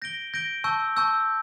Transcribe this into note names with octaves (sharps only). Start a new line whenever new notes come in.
G6 A#6 D7 G7
G6 A#6 D7 G7
A5 C#6 E6 G6
A5 C#6 E6 G6